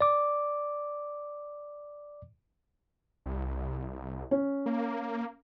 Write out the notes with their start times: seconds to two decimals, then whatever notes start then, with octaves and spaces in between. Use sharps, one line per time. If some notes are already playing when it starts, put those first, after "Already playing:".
0.01 D5 D6
3.26 C2
4.31 C#4
4.66 A#3